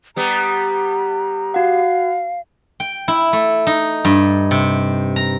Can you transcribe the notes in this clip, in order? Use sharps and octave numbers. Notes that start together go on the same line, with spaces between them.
G3 B3 A#5
F#4 F5 F#5
G5
E4
A3
D#4
G2
C3
A#5